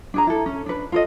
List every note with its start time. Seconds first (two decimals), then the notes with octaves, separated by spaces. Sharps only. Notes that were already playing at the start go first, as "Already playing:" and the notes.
0.14 D4 G#4 A#5
0.27 E4 A4
0.46 C#4
0.66 D4 B4
0.92 F4 A4 D#5